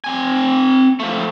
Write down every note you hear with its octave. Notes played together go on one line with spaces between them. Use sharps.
C4 G#5
F3 A3